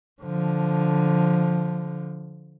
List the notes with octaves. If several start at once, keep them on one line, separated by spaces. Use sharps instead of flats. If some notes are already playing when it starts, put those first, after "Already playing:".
D3 F3